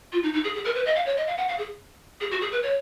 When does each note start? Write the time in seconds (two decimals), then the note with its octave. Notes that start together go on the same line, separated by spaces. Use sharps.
0.12 F4
0.23 D#4
0.33 D#4
0.44 G#4
0.55 G#4
0.65 A#4
0.75 B4
0.86 D#5
0.96 F5
1.06 C#5
1.17 D#5
1.27 F5
1.37 F#5
1.48 F5
1.58 G#4
2.21 G#4
2.31 F#4
2.41 G#4
2.52 B4
2.63 C#5